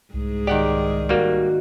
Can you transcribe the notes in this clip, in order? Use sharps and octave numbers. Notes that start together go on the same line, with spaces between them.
C2 G#2 G#4
D#3 G4 D5 F#5
G3 A#3 F#4